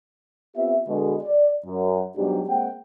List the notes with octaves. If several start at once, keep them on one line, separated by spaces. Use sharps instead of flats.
B3 C4 F4 G4 E5
B2 D3 G#3
D5
F#2
G#2 B2 F#3 G3 D4 G4
G#3 A#3 C4 F#5 G5